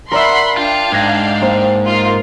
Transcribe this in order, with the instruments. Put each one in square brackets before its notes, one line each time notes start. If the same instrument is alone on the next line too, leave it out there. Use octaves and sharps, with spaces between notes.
[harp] A#4 D5 E5 [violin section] F#5 B5 C6
[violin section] D4 F5 G5 [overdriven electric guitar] F4
[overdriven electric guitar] G#2 [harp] G#6 A#6 D#7
[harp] A#3 C5
[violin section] F4 A#4